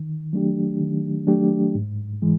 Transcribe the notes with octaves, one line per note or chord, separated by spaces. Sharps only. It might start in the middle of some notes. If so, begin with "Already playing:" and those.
Already playing: D#3
F#3 A3 D4 G4
D#3
F#3 A3 D4 G4
G#2
E3 G#3